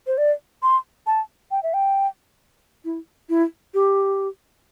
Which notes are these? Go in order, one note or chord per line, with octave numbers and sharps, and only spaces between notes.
C5
D5
C6
A5
G5
E5
G5
E4
E4
G4